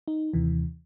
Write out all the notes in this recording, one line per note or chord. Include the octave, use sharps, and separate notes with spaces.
D#4
D#2 C3 E3